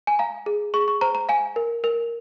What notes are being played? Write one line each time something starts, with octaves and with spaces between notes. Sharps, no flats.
G#5
F5 A#5
G#4
G#4 C#6
C#6
C5 A#5
A#5
F5 G#5
A#4
A#4